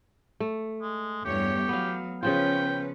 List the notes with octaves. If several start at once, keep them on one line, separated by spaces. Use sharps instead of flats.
A3
G#3
E2 G2 G4 C#5
F#3 B3 F5
C#3 F3 C#4 F4 B4 G5